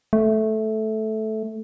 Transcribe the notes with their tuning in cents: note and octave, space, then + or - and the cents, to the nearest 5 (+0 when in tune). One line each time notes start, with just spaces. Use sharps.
A3 -10